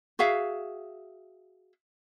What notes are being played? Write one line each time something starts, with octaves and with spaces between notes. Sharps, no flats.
F#4 G#4 E5 F5